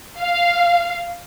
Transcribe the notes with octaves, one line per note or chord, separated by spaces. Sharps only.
F5